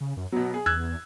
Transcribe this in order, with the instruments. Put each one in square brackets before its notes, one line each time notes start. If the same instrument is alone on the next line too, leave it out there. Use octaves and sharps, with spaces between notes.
[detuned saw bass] C#3
F#2
[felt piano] B2 F#3 [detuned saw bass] B3
[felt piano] G#4
[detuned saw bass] E2 [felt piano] E6 F#6 G#6